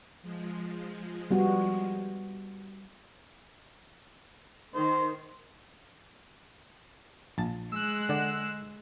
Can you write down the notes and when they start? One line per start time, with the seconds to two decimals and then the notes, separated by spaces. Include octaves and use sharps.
0.22 F3 G#3
1.31 G3 B3 F#4
4.75 D#3 C5
7.38 A#1 A5
7.72 G#3 E6 F#6
8.09 D3 D5 F#5